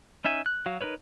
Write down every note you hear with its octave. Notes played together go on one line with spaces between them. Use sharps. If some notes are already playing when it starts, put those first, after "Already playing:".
C#4 D#4 E5 G#5
F#6
F#3 F#4 F5
D#4 A#4 B4 C#5